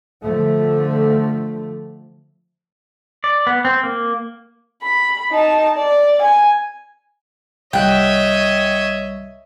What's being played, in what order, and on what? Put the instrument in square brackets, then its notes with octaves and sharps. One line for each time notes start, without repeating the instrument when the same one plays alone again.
[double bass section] D3 F3 A3
[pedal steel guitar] D5
B3
C4
A#3
[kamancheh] B5
D#4 A5
D5
G#5
[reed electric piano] C2 G3 [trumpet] C#5 [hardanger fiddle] D#5 E5 [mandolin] F#5 G5